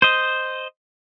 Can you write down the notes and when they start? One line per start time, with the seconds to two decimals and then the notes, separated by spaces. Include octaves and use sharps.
0.02 C5 D#5